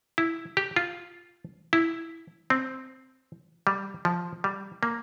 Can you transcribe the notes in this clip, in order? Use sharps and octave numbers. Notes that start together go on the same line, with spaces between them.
E4
G4
F4
E4
C4
G3
F3
G3
A#3